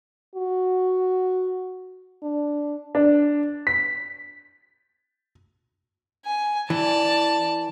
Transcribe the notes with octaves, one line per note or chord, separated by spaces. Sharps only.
F#4
D4
D4
B6
G#5
E3 D5 A5